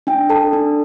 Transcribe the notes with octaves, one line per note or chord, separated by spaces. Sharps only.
D4 G5
A4 A5
D4